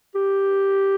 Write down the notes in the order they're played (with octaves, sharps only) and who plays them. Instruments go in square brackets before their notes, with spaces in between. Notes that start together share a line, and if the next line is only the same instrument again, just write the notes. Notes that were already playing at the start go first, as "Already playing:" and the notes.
[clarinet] G4